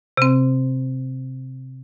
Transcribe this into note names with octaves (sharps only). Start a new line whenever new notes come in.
C3 C4